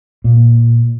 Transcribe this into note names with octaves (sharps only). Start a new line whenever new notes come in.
A#2